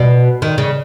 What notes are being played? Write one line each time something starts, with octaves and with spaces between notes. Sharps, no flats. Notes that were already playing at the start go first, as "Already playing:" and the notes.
Already playing: B2
D#3
C#3